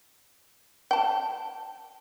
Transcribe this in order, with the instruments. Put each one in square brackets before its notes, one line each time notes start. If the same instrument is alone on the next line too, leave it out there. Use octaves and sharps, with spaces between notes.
[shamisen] G5 A5